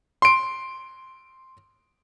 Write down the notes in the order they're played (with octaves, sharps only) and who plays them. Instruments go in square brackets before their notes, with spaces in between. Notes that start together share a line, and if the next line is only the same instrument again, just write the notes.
[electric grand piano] C6 D7